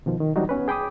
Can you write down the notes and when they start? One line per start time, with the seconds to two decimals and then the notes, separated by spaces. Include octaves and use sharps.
0.06 B2 D#3 F3
0.20 D#3
0.36 E3 F#3 G3 D4 D#4 F#4
0.49 B3 C#4 B4
0.68 G#4 G5 B5 D6 D#6